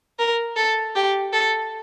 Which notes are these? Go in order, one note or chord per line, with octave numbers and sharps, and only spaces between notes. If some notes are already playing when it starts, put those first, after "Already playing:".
A#4
A4
G4
A4